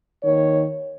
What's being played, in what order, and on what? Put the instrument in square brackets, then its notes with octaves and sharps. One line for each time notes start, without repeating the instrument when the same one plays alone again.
[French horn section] D#2 D#3 C#5